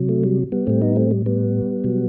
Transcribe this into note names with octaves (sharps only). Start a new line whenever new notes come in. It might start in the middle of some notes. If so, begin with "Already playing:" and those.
Already playing: C3 F#3
A3
G3
G3 B3
A2 G3 A3 C4
B3 D#4
A3 C4
G3
G3 B3
B2 F#3